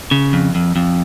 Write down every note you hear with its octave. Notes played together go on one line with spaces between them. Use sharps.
C#3
F2
F2
F2